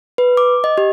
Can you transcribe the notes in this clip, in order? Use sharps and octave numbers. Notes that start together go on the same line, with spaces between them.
B4
D6
D#5
G4